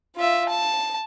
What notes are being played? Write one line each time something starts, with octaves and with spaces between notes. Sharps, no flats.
F4 E5
A5